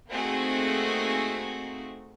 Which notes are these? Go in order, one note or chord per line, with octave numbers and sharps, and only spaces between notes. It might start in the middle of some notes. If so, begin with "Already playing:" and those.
A3 A#3 C4 D#4 F#4 G#4